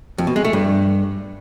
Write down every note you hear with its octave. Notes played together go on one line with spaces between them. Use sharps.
F2
B2
G#3
A3
G2